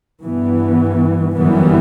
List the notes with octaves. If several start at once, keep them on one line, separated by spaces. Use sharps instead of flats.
G2 E3 B3
G1 F#2 E3 G3 B3